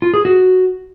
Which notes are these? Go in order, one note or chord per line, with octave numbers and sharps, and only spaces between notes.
F4
G#4
F#4